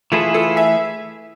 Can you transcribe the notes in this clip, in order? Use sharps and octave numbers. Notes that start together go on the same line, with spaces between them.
E3 A3 E4 F4 G#4 A4 B4
F4 A4
E5 G#5